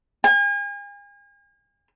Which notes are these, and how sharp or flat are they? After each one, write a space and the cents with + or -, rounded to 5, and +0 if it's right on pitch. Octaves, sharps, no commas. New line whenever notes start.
G#5 -40